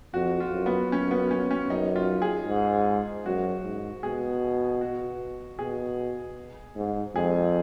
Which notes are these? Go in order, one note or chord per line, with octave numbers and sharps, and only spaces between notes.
F2 F#4
F4
F#2
B3
F#2 C#4
B3
C#4
C#4
F#2 D#4
F4
G#4
G#2
F#2 F#4
G#2
B2 G#4
F#4
B2 G#4
G#2
F2 G#4